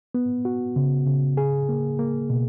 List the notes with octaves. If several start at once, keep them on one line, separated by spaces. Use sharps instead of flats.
B3
F#4
C#3
C#3
G#4
A#3
A#3
B2